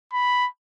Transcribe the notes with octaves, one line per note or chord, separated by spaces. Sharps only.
B5